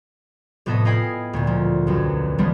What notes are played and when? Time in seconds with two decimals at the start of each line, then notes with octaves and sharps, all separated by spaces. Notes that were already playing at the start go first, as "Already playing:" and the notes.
0.66 F1 A2 B3 A4 D#5
0.85 E4 D#5 F5 G5 G#5 B5
1.33 D2 A#2
1.47 F3
1.87 B1 F#2
2.38 E3 F3 G3 G#3 B3 D4